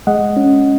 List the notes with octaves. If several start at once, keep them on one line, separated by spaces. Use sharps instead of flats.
G#3 D#5 F#5
C#4